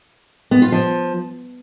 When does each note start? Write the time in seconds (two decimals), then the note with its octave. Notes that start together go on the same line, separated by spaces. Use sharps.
0.51 B3
0.62 F4
0.72 F3